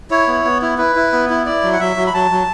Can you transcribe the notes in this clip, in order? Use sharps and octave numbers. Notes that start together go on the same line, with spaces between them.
E4 C#5
B3
B3
E4
E4 B4
E4
B3
E4
E4 D5
F#3
F#5
F#3 E5
F#3
B5
F#3 A5
F#3